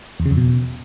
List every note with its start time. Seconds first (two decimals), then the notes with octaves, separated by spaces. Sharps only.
0.20 E2
0.25 C#3
0.31 F2
0.37 B2